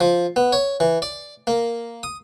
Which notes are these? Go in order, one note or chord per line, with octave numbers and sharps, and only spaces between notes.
F3
B3
C#5
E3
D5
A#3
D#6